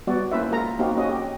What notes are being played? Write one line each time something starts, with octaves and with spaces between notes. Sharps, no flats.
G3 B3 F#4 D5
A#3 C#4 E4 B4 C5 E5
G#3 F4 A#4 A#5
A#3 C4 D#4 F#4 G4 F5
C#4 F#4 D#5
G4